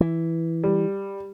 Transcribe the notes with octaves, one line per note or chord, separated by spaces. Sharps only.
E3
G3